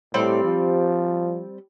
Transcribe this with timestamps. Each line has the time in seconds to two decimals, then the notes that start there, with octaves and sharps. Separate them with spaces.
0.14 A2 G3 C4 D5
0.44 F3